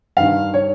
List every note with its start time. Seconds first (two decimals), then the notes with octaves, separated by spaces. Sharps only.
0.17 G2 D#3 F5
0.54 C#5